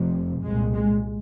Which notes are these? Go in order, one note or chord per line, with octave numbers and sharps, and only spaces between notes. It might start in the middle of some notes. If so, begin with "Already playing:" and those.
Already playing: F1 F2 C3
C2 A#2 G#3
G#3